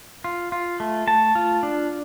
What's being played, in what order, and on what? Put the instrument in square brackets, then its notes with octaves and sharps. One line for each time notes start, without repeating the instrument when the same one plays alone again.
[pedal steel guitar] F4
F4
A3
A3 A5
F4
D4